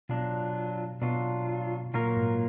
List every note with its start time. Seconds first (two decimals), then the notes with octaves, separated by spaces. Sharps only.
0.09 B2 F#3 D4 F4
1.01 B2 F#3 D4 F4
1.94 A#2 F#3 A#3 F4 A#4
2.17 G#2